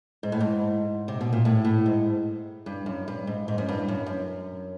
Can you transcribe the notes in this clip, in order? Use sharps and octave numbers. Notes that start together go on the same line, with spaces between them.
G#2
A2
G#2
C3
B2
A#2
A2
A2
G#2
G2
F#2
G2
G#2
G#2
F#2
G2
F#2
F#2